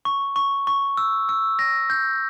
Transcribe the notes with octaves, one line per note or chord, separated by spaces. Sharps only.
C#6
C#6
C#6
E6
E6
A#6
G6